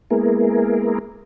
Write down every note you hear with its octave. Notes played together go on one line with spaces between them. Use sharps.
G#3 A#3 B3 E4 G#4 A#4